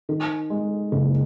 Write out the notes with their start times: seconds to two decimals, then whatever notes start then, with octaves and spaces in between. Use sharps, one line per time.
0.09 D#3
0.50 G#3
0.92 F#1